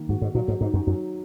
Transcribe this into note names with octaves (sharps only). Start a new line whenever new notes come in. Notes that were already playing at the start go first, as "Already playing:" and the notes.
Already playing: D#3 A#3
G#2 F#4
G#2
A#2 F#3
G#2
G#2 D#4
F#2
F#2 F#3